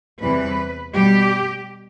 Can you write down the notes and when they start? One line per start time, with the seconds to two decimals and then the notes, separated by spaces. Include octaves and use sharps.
0.21 E2 C3 E3 G3 B4
0.94 B2 G3 G4